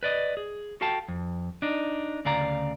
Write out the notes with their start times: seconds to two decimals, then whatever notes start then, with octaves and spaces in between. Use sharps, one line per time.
0.03 B4 D5 D#5
0.37 G#4
0.81 F#4 A4 F5 G5 A5
1.08 F2
1.62 D4 D#4
2.25 D2 C#3 D5 F5 A#5